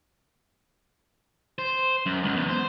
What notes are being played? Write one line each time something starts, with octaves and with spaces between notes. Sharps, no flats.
C5
F#2
C#2
E2
C5